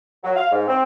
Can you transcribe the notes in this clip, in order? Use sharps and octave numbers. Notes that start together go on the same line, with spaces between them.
F#3
F5
G#2
C4